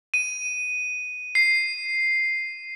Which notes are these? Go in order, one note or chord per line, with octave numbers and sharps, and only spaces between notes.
D#7
C7